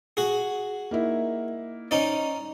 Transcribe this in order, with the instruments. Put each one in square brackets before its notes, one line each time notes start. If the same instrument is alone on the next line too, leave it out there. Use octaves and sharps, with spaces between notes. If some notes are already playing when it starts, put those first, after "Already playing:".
[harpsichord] F#4 G#4
[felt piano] A#3 D#4 E4
[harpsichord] C#4 D#4 D5 [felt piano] C5